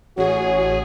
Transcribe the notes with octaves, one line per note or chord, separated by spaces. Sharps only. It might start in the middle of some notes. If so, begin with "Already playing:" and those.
A1 F#4 G#4 C#5